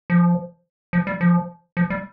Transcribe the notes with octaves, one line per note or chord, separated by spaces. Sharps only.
F3
F3
G3
F3
F3
G3